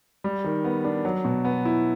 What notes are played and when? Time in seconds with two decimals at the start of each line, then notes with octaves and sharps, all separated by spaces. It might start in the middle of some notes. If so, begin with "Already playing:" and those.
0.24 G3
0.44 D#3
0.64 B3
0.84 D4
1.05 F#3
1.25 B2
1.45 B3
1.65 E4